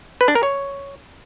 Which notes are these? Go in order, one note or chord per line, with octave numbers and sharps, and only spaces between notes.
B4
D4
A#4
C#5